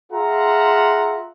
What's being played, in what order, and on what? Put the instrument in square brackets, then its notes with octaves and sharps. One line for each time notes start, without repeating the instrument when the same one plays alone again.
[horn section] F4 G#4 E5 F#5 A#5